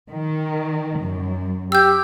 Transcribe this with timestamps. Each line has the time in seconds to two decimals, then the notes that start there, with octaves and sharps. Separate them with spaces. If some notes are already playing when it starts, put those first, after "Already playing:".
0.11 D#3
1.01 F#2
1.72 G4 E6 G6